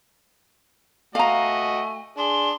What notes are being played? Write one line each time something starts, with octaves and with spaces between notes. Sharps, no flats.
A3 F#4 D#5 F5 G#5 A#5
D4 G#4 C6